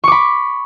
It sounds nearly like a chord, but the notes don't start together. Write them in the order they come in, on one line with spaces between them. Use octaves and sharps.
C#6 D6 B5